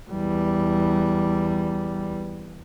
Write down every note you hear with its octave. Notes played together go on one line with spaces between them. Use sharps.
E2 G3